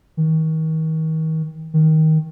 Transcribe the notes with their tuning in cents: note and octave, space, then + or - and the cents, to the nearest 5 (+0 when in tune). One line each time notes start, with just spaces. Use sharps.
D#3 +35
D#3 +15